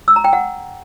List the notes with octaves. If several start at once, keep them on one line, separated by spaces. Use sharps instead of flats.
E6
A#5
G5
F#5